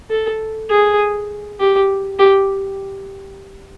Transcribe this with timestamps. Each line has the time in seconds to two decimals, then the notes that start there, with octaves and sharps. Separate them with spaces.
0.10 A4
0.69 G#4
1.59 G4
2.19 G4